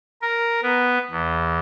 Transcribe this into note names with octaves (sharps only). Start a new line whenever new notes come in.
A#4
B3
E2